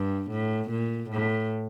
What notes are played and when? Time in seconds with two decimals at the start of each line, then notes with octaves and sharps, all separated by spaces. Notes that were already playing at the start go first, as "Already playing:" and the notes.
Already playing: G2
0.31 A2
0.71 A#2
1.10 A2